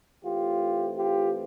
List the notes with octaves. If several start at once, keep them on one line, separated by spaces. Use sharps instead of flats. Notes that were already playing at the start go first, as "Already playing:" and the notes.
E3 A3 C4 F4 G4
F4 G4